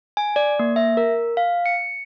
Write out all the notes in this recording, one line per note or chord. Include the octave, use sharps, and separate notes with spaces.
G#5
D5
A#3
E5
A#4
F5
C#7